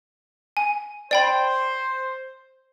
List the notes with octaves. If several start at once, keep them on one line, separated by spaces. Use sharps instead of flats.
G#5
C5 D5 G5 B5